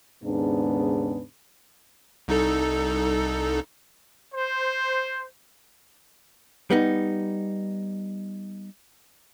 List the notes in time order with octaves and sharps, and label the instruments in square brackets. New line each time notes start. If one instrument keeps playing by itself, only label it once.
[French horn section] D#2 G#2 C#3 B3 D4
[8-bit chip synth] C2 D#4 A4
[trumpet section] C5
[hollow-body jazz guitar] G3 B3 D#4